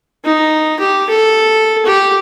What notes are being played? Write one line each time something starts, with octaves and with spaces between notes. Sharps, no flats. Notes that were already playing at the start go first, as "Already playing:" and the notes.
D#4
G4
A4
G4